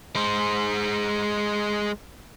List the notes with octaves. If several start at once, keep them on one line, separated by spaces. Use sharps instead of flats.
G#3 C5